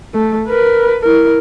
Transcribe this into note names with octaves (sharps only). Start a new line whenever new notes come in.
A3
A#4 B4
E4 A#4